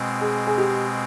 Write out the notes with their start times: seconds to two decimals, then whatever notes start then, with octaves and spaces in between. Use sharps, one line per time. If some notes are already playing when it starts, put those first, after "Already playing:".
Already playing: B2 G#3 C4
0.21 G#4
0.47 G#4
0.58 G4